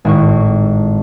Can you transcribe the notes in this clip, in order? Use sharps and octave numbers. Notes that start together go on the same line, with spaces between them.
G#1 A2 C#6